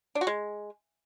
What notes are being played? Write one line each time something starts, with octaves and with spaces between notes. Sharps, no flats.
D4
F#4
G#3